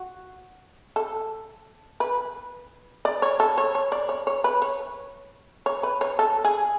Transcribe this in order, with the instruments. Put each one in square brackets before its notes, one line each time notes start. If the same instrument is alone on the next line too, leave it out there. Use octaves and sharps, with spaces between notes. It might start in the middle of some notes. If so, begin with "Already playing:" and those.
Already playing: [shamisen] F#4
A4
B4
D5
C#5
A4
C#5
C#5
D5
C#5
C#5
B4
C#5
C#5
B4
C#5
A4
G#4